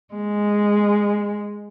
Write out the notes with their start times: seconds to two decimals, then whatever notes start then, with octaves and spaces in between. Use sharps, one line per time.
0.14 G#3